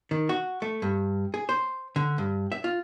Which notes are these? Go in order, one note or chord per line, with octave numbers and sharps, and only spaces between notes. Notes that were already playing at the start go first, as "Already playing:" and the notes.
D#3
F#4
A3
G2
G#4
C5
D3
G2
E5
F4